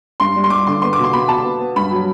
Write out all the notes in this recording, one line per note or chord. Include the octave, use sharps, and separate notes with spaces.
G2 C6
G3
C6
G3 D6
D3 C6
B3 C6
D6
B2
C6
B2 B5
B2 A5
B3
B3
G2 B5
F#3